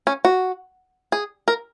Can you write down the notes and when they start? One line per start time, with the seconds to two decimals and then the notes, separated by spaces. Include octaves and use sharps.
0.07 C#4
0.25 F#4
1.12 G#4
1.48 A#4